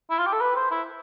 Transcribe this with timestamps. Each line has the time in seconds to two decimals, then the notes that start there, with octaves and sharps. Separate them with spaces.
0.10 E4
0.18 F4
0.26 G4
0.33 A4
0.41 B4
0.56 C5
0.71 E4